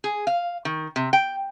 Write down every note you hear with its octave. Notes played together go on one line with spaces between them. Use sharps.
G#4
F5
D#3
C3
G5